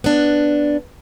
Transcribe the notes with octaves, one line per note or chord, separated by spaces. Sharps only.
B3 D4